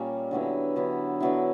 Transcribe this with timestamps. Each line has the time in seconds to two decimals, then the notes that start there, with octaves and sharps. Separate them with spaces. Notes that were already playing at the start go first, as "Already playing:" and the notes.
Already playing: A#2 G3 A#3 C#4
0.31 D3 F#3 B3 E4
0.76 D3 F#3 B3 E4
1.20 D3 F#3 B3 E4